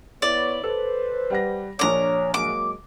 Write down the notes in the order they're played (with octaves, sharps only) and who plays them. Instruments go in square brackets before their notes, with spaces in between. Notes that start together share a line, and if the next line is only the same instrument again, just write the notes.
[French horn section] B3 E4 C#5 [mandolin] D5
[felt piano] A4 [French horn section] B4 C5
[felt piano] G3 F#5 A#6
[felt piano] A#1 D4 A#4 [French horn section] C#5 [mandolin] A#5 D6
[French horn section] F#3 G#3 A#3 [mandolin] D6